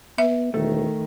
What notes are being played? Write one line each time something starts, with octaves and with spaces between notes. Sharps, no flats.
B3 E5
E1 D#3 A3